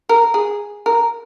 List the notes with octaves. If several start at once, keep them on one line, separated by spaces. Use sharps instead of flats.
A#4
G#4
A#4